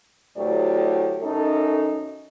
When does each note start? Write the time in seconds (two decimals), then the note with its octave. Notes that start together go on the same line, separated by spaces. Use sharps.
0.37 D2 A2 F#3 G4 D5
1.21 F#2 C#4 D#4 A4